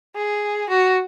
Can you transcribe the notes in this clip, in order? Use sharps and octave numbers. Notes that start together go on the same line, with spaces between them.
G#4
F#4